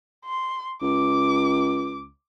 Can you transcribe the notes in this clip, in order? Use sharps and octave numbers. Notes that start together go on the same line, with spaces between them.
C6
C#2 D6